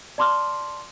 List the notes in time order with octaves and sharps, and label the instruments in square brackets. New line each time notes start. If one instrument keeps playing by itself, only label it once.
[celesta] D5 A5 C6 D6 F6